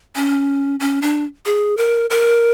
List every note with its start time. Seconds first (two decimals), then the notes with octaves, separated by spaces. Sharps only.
0.15 C#4
0.80 C#4
1.02 D4
1.46 G#4
1.77 A#4
2.10 A#4